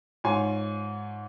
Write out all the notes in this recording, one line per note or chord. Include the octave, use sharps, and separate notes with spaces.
G#2 F4 C#5 G#5 C6